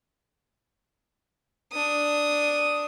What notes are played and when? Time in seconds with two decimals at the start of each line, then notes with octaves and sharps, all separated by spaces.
1.72 D4 D#6